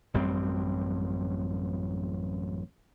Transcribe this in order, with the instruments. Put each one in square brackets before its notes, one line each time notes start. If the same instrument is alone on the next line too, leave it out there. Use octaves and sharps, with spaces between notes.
[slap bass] A1 F#2 G3 C4